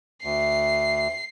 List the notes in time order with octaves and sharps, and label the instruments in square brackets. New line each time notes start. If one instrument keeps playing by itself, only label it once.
[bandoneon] D2 [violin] C7